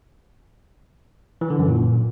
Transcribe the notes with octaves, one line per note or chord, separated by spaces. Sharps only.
E3
D3
F#2
A#2